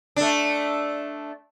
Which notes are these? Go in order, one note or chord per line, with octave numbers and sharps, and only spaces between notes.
A3 D4